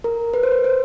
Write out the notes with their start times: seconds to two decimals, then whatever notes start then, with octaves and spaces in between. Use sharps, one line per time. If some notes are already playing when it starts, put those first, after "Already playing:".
0.04 A#4
0.34 B4
0.43 C5
0.51 B4
0.64 C5